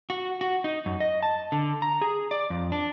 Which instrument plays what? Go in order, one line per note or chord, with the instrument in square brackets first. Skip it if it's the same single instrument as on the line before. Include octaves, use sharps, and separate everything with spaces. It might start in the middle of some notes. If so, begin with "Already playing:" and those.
[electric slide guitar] F#4
F#4
D#4
F#2
D#5
A5
D3
A#5
G#4
D5
F2
D4